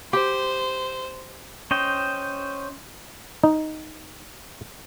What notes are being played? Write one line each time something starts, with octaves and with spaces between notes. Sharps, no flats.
G4 C5
C#4 C5 D#5 G5
D#4